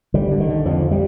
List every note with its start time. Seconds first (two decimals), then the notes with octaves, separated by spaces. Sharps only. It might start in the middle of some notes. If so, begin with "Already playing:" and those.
0.14 D3 G3
0.31 D3
0.40 D#3
0.49 D3
0.66 F2 F3
0.91 G3